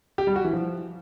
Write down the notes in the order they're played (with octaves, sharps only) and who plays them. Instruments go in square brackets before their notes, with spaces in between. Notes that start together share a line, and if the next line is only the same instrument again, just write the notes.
[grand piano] G4
G3
F#4
E3
F3